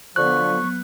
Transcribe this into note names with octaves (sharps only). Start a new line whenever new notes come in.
D3 F3 F#3 B3 C#6 F#6